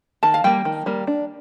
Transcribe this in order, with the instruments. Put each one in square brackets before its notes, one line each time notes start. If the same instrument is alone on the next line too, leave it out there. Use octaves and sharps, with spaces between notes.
[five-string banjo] D#3 [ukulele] A5
[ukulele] F5
[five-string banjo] G3 A#3 [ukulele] G5
[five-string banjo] D#3
G3 A#3
D4